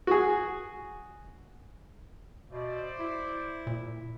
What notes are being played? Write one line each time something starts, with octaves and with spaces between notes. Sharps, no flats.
F#4 G#4
B2 C5 D5 E5
E4
A#2